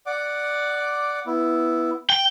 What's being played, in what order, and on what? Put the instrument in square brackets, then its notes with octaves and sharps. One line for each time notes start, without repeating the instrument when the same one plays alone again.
[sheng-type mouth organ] D5 F#5 D6
B3 E4
[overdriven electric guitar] G5